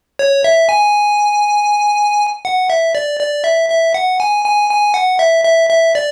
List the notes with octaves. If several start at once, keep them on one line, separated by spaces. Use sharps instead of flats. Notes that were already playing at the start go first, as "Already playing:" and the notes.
C#5
E5
G#5
F#5
E5
D5
D5
E5
E5
F#5
G#5
G#5
G#5
F#5
E5
E5
E5
D5